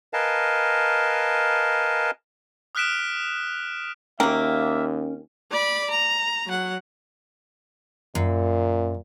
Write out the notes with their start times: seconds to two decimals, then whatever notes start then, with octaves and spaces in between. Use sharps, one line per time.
0.13 A#4 B4 D#5 F5 G#5 A5
2.75 D#6 F6 F#6 B6 D7 E7
4.20 D#2 F#3 A#3 C#4 A#4 E5 G5
5.51 D5 B5
5.90 A#5
6.47 F#3 F#5
8.15 F#2 A#2